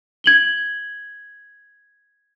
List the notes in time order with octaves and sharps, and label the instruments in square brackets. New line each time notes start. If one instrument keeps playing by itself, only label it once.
[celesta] G#6 F#7 G7